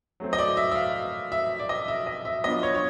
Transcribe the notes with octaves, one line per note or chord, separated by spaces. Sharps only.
F#3 A3 C4
D#5
D5
E5
E5
F5
E5
D5
D#5
E5
D#5
E5
F#3 B3 D4 F4 D#5
C#5
C#5